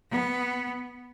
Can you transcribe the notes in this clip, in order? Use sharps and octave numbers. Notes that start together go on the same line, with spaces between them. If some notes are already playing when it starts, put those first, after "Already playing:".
B3